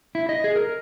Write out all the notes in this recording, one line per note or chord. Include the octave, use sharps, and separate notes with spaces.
E4
D#5
G#4
A#4